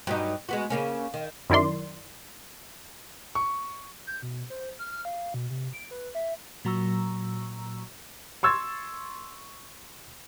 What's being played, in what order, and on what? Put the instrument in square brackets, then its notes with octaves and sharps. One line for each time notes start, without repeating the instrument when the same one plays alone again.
[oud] G2 F#3 D#4
G#3 B3 F#4
C#3 A#3 C#4
D#3
[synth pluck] F#2 D#3 E4 A#4 D5 C6
[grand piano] C#6
[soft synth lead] G6
B2
C5
F6
F5
B2
C3
D7
B4
E5
[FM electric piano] A#2 F#3 A#5 C#6 E6
[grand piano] C6 C#6 E6 G#6 A6